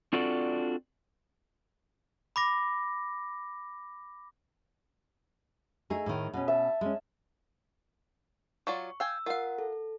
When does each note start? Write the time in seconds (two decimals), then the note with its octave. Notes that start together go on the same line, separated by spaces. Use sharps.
0.13 C4 D4 F4 F#4 A4 D5
2.36 B5 D6 A#6
5.90 A3 D#4 G#4
6.06 A2 D#3
6.33 B2 C#4
6.48 E5 A5
6.81 G#3 C#4
8.67 F#3 F4 D5 C#6
9.00 F5 G5 G#5 E6
9.26 F4 A#4 F5 F#5
9.58 A4